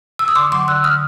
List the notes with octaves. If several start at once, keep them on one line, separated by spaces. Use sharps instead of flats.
E6
D#6
D3 C6 D6
F#3 C6 D6
D3 E6 F#6
D#6 F6